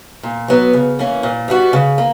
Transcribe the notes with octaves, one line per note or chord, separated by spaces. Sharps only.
A#2
F#3 B3
C#3
E3 A#3 C#4
A#2
G3 B3 F#4
C#3
A#3